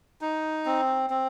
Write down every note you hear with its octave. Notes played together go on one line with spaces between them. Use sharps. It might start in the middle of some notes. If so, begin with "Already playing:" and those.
D#4
C4
C4